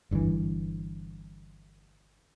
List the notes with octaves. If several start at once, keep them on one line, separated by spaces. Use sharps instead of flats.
G1 G2 D3 E3